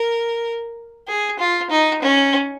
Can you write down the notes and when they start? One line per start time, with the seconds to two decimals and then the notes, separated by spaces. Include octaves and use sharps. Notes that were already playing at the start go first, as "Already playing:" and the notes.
Already playing: A#4
1.08 G#4
1.39 F4
1.70 D#4
2.02 C#4